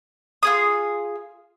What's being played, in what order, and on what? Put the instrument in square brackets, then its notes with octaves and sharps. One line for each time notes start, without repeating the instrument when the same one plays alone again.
[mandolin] F4 G#4 D#6